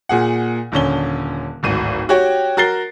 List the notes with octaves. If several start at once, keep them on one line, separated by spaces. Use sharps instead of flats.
A#2 G#4 F#5
D#1 D3 C#4 G7
D1 G#1 D#7
F#4 G4 C#5 G5
F#4 A#4 A6 C7 G7